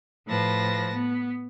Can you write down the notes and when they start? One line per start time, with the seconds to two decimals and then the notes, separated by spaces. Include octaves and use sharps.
0.27 A2 F3 B4 A5 A#6
0.94 B3